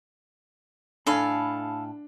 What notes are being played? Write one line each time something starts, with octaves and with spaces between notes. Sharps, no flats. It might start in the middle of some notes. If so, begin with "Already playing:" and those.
A2 D4 A4 F5 G#5 B5